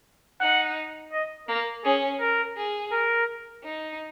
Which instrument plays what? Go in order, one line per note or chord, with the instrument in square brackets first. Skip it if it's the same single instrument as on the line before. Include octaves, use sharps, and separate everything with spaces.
[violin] D#4 [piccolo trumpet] F#5
[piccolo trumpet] D#5
[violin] A#3 [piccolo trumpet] A#4
[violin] C#4 [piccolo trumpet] G#4
[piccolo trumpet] A#4
[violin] G#4
[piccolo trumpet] A#4
[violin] D#4